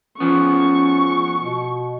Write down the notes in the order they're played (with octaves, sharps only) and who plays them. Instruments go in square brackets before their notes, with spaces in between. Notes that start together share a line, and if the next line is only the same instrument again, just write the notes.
[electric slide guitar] F3 B3 [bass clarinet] C#4 [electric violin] C#6
[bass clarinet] B2